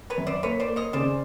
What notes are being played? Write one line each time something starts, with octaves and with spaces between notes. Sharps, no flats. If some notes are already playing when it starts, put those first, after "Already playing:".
B4 C#5
F#2
C5 D5
A#3 B4 C#5
C5 D5
A#3
C#5 D#5
C#3 C5 D5